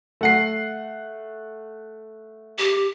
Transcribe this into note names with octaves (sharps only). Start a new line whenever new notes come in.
A3 F#5 C7
G4